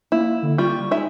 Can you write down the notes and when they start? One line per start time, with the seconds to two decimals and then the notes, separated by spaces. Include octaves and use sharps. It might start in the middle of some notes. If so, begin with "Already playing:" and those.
0.12 A#3 E4
0.43 D3
0.58 G3 F4 C#6
0.91 G#3 D#4 E5